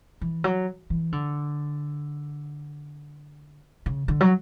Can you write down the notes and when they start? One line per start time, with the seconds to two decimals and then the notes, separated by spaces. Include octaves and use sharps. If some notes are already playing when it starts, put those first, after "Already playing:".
0.21 E3
0.44 F#3
0.90 E3
1.12 D3
3.86 C#3
4.08 D3
4.21 F#3